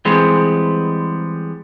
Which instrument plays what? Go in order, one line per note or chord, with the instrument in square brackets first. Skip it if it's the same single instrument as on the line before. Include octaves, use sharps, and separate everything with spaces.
[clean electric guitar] E3 G3 G#3 B3 C4